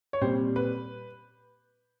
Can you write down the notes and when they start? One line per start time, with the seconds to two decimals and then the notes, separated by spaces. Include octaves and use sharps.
0.13 C#5
0.21 A#2 G3 C4 C5
0.56 B4